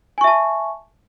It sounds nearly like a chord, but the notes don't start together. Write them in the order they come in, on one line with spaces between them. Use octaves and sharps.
G#5 C#6 E5 A5